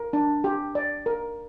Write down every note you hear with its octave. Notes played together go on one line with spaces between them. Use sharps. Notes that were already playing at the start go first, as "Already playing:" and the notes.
Already playing: A#4
D4
G4
D5
A#4